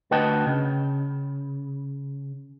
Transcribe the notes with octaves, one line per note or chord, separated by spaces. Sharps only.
D2 B4 D#5 F#5 G5 A5
C#3